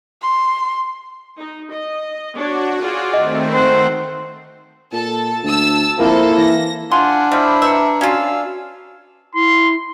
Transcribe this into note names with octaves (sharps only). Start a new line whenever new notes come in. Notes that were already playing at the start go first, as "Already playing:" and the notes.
C6
D#4
D#5
D4 F#4 C#5 D5
F4 G#4 D5
D#3 A3 C4 D#5
C5 F#5
A#2 A4 A5
D2 A5 E6
F2 A#3 E4 A4 C5
E3 A#6
D4 F4 F#5 G#5 C6
G3 E4 C5 B5 D6 F6
B4 E5 A#5 C#7
C#4 F4 F#4 D5 F5 E6
E4 C6